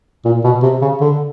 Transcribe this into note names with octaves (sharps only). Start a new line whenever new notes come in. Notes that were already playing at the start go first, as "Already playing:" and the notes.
A#2
B2
C3
C#3
D3